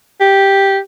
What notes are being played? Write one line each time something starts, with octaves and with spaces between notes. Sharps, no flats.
G4